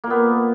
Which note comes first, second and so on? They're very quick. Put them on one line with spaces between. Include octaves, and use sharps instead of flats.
A#3 A#2 B3